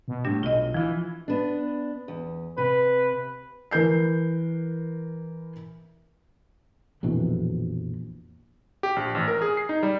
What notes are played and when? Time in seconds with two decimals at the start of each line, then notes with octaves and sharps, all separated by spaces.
0.08 B2
0.25 A2 G3 D4 G4
0.43 B1 F4 D#5
0.74 E3 F3 F4
1.28 B3 D4
2.08 E2
2.58 C3 B4
3.71 E3 A#4 G6 C7
7.03 A#1 F2 B2 E3
8.83 G4
8.96 A#1
9.15 A1
9.28 A#4
9.42 G#4
9.57 C7
9.69 D#4
9.83 G3